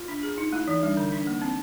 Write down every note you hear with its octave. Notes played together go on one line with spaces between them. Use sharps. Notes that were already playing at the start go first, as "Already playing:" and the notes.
Already playing: F4
D4
G#4
D#4
A3 E4
E3 D#4
G3 D4
D3
D4
A#3
C4